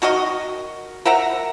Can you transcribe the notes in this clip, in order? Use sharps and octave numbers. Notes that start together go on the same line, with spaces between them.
D#3 F#4 A#4 D#5
A#4 E5 F#5 A#5